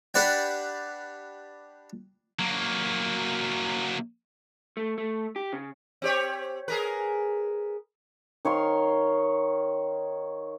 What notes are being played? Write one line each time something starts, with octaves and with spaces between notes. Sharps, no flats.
D4 G4 B4 D5 F#5 G5
F#3 A#3
A3
A3
G4
C#3
C4 G4 C#5
G#4 A#4 B4
D#3 C#5 F5 C6